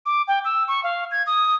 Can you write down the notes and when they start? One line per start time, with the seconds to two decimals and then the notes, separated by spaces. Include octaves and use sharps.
0.06 D6
0.28 G5
0.45 E6
0.68 C#6
0.84 F5
1.11 G#6
1.27 D#6